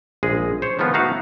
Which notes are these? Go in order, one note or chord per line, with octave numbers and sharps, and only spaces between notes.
A#1 G#3 G#4 D#5
C5 C#5
D#3 F3 G#3 B3 F4
A3 B3 D#4 E4 F#4 F5